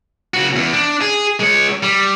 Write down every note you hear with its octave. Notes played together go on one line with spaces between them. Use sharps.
C#3 F#4
E2
D4
G#4
G#3 C#5
G3